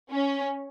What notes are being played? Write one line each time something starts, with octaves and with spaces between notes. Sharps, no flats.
C#4